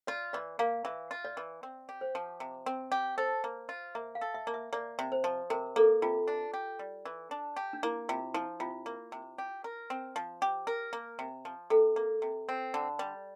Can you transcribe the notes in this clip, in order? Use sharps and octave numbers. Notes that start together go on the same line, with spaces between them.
F4 D5
E3 D5
A#3 F5
E3 E5
F4
D5
E3
C4
G4
C5
F3
C3
C4
G4
A4 C5
A#3
F4
A#3 E5
F5
A4
E5
A#3
E5
A#3 D5
C3
C5
F3
C3 A#4
A#3 A4
C3 F4
D4
G4
G3
E3
D4
G4
D4
A#3 E4
C3 F4
F3 E4
C3 F4
A#3
C3
G4
A#4
C4
F3
G4
A#4
A#3
C3
F3
C3 A4
A#3
C3
C4
D3
G3